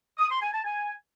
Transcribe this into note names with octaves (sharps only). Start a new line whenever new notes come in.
D#6
C6
G#5
A5
G#5